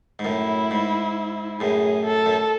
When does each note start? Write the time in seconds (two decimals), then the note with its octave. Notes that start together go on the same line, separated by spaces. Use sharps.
0.19 G#2
0.25 F#2 A2 E4
0.71 G#2
1.60 F#2 A2 G#4
2.06 A4
2.26 F#2